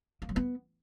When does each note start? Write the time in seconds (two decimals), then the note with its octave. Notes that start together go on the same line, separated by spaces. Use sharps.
0.22 A#3
0.29 F#3
0.36 B3